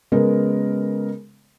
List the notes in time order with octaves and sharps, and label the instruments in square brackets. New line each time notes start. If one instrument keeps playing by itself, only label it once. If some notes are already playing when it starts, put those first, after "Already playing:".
[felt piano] C#3 G#3 B3 A#4